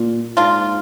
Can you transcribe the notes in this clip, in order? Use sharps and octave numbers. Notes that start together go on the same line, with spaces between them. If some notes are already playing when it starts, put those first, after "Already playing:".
Already playing: A#2
G#2 A#3 D4 F4